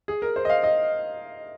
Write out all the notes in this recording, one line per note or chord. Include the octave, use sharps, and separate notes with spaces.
G#4
A#4
C5
D#5
F5
D#5